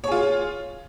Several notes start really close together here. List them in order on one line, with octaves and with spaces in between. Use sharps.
C#5 G#4 F4